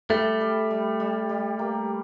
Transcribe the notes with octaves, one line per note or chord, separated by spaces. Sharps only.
G3 A3
G3
G3
G3
G3
A#3